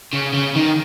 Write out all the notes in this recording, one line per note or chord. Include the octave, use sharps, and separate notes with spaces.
C#3
C#3
D#3